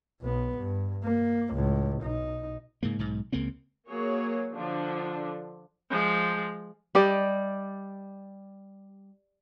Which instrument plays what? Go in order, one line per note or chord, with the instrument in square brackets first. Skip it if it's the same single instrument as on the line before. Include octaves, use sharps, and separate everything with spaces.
[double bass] B1 B3
G2
A#3
C#2 A2
B1 D#4
[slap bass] G#2 C#3 A#3
B1 G#2
C#2 C#3 A#3 C4
[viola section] F#3 A#3 G#4 C#5
D3 F3 D4
[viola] F3 G#3
[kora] G3 G4 D5 D#5